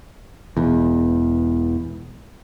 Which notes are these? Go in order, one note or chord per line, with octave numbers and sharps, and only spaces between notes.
E1 E2